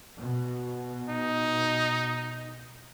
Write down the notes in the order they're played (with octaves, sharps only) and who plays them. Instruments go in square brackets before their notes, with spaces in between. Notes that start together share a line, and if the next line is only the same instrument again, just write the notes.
[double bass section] B2
[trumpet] D#4